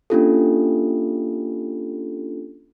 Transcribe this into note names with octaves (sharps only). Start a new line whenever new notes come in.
A#3 C#4 D4 F4 G4 A4